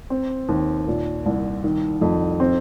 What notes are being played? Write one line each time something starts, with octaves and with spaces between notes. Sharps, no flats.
C4
D#2
A#2
C2
D#3
F2
C4